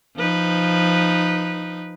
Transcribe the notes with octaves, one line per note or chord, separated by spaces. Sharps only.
F3 D#4 B4